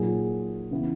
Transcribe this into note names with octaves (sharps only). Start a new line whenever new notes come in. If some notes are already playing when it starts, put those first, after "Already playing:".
Already playing: A#2 F#3 A#3 D#4 G#4
C#3 E3 B3